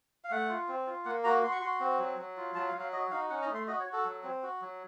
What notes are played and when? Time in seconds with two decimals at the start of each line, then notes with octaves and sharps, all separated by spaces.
0.24 F5
0.31 A3 F#5
0.49 F4
0.68 C4
0.87 F4
1.05 A#3 F#5
1.24 F#4 A#5
1.43 F#4 C6
1.52 C#6
1.62 F#4 C6
1.80 C4
1.99 F#3
2.18 F#3
2.37 F4
2.55 F#3 A5
2.68 F5
2.74 F#3
2.80 F5
2.92 F#4 D#5
3.11 D#4 F5
3.30 C#4 F#5
3.42 A#5
3.49 A3
3.54 C6
3.68 F#4 D#5
3.80 C#5
3.87 F#4
3.93 A4
4.05 F#3
4.23 C4
4.43 F#4
4.61 F#3